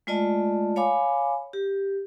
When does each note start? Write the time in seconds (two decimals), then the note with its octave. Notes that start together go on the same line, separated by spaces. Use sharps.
0.07 G#3 A3 F4 D5 D#5 A5
0.76 C#5 F5 G#5 B5 D6
1.53 G4